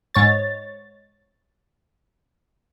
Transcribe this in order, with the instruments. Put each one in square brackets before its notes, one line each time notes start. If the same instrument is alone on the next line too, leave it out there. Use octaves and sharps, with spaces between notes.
[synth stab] G#2 C#5 A6